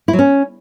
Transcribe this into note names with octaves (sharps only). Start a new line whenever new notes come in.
E4
F#3
C#4